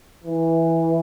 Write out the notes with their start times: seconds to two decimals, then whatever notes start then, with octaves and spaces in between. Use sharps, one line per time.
0.24 E3